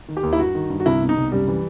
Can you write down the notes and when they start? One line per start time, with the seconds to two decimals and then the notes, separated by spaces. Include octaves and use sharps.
0.08 D#3
0.17 G4
0.23 D#2
0.33 E4
0.39 G2 F#4
0.55 D#3
0.70 G2
0.80 F#4
0.86 C2 E4
1.01 B2
1.09 D#4
1.17 C2
1.32 F#2 G3
1.48 E3